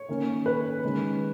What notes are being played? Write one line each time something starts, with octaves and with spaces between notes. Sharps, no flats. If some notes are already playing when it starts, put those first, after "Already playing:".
Already playing: C#5
D#3 A#3 C#4
B4
D#3 G#3 C#4